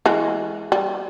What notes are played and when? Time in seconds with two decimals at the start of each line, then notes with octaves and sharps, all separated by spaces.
0.06 E3 G#3
0.72 G3